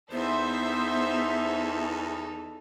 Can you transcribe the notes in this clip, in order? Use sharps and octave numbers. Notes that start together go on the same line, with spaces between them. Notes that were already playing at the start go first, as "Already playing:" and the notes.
E2 B3 D#4 A4 C5 E5